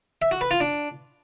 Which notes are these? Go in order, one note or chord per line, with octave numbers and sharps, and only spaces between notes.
E5
F#4
B4
F4
D4